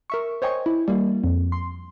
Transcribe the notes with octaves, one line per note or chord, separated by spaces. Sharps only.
A#4 E5 C#6
C5 C#5 D#5 G5 G#5 C#6
E4
G3 A#3
F2
C6